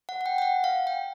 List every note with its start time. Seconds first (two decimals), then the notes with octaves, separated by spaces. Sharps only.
0.09 F#5
0.21 F#5
0.26 G5
0.38 G5
0.42 F#5
0.64 F5
0.87 G5